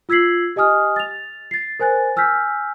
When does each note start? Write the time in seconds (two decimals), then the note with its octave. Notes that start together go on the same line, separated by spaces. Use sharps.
0.09 F4 E6 G#6 B6 C7 F#7
0.56 G4 D#5 G#5 D#6 F6
0.96 A6 F7
1.51 A6 C7
1.79 A#4 C5 G#5 F#6 A6
2.16 G#5 E6 F6 G6 B6